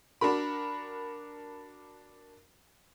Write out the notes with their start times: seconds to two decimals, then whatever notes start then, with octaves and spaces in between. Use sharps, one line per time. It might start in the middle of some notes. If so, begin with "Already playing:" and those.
0.21 D4 F#4 A#4 B5